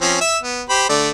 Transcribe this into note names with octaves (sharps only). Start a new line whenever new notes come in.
F3 C4 C#4
E5 E6
B3
G4 C5 B5
D3 A3 D5